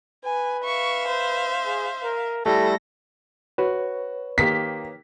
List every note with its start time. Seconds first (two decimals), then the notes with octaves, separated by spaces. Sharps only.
0.25 B4 G#5
0.65 E5 F5 C#6
1.08 C5
1.66 G#4
2.03 A#4
2.46 G3 A3 E4 A4 A#6
3.58 F#4 B4 C#5
4.38 D#3 A#3 G4 B6